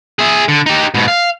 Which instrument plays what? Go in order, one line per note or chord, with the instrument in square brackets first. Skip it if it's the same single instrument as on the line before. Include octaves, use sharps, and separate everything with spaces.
[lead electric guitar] G#4 E5
D3
D#4 G4
G#2 B2
F5